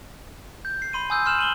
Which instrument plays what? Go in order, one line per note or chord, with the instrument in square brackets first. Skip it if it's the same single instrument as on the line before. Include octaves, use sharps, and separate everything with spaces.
[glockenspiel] G6
C7
B5 C6 D#7
G#5 C6 D#6 E6 G6
C6 F6 E7 F#7
D#7 F#7 G7